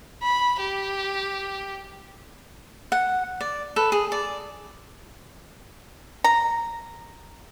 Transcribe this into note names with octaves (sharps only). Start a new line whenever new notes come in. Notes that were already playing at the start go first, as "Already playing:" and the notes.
B5
G4
F#5
D5
A4 B4
G#4
D5
A#5